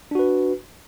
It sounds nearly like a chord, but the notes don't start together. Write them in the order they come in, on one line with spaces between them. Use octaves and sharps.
D4 F#4 B4